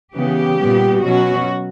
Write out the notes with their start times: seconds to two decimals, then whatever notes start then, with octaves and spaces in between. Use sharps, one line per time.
0.15 C#3 E3 B3 G4
0.58 A#2 G3 B3
1.02 B2 F#3 C#4 F#4